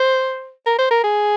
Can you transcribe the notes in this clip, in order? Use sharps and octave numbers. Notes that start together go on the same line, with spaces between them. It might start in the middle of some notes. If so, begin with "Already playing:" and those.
Already playing: C5
A#4
C5
A#4
G#4